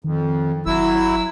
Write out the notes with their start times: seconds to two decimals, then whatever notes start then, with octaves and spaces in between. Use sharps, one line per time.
0.04 F2 D#3
0.66 G1 F#3 E4 E6